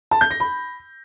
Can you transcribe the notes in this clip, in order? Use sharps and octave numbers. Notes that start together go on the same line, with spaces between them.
A5
G6
A#6
B5